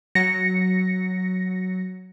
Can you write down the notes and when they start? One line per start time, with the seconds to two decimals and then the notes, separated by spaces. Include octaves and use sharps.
0.15 F#3 A#6 C#7